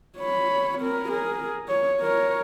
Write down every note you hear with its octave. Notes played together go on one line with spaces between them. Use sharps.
C#5 B5
C4 A#4
G#4 A#4
C#5
A#4 C#5